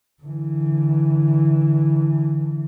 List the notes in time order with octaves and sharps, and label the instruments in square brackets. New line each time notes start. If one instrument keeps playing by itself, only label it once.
[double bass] D3 E3